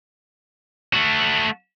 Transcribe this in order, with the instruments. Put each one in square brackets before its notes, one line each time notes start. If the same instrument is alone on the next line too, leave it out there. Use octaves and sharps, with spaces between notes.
[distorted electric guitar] A3 F#4